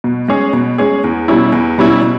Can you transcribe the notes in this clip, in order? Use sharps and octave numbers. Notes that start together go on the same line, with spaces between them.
B2
G#3 C#4 G#4
B2
G#3 C#4 G#4
E2
B2 G3 C#4 E4
E2
B2 G3 C#4 E4
B2